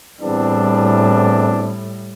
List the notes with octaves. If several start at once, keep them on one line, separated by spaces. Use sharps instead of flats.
E2 A2 G3 C4 D4